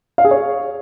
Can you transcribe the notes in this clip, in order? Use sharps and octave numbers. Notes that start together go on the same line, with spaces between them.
F5
G#4
C#5